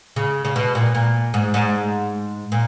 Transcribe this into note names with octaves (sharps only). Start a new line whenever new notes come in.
C#3
C#3
B2
A#2
A#2
G#2
G#2
A#2